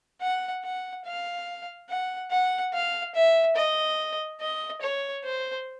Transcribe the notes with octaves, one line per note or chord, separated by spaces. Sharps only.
F#5
F#5
F5
F#5
F#5
F5
E5
D#5
D#5
C#5
C5